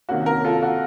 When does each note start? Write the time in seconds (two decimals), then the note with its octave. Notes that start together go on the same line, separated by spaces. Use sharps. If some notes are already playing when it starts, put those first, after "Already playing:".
0.09 C3 D#3 A#3 C#4 F#4
0.26 F#4 A#4
0.44 F4 A4
0.62 F#4